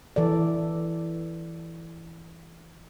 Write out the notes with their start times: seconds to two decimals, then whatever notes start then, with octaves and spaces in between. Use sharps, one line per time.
0.16 E3 A4 D5